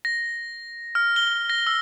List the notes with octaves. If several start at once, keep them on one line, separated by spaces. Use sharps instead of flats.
A#6
F6
G7
A#6
E6